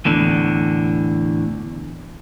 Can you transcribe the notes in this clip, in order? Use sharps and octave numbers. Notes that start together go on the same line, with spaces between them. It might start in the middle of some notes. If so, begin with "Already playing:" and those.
E2 A2 D3